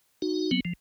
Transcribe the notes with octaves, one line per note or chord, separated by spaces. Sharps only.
D#4 F#4
F#3 B3 C4
F3